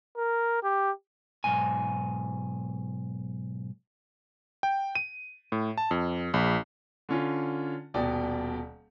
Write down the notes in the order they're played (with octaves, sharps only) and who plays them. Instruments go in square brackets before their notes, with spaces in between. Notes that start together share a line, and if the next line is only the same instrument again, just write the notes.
[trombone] A#4
G4
[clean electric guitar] B1 G#2 G#5
[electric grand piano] G5
D#7
A2
A5
F2
A#1
[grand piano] D3 C#4 F4
D#1 B2 D5 G5 D#6